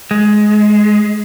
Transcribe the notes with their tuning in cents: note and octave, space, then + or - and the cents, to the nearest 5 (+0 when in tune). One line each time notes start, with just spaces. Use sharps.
G#3 +15